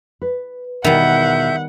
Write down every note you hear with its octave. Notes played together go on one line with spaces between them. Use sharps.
B4
E2 B2 D#3 G3 E5 F#5 G6